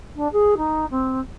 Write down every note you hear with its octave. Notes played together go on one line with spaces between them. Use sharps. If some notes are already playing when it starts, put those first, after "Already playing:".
D4
G#4
D#4
C4